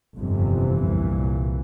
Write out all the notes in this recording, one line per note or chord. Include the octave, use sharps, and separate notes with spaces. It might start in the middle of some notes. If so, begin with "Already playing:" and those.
G1 F2 C3
E3
C2 A#2